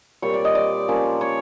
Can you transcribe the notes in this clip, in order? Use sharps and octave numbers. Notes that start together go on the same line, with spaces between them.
A#2 G3 C4 C#5
D5
D#5
D5
F3 A#3 C#4
C#5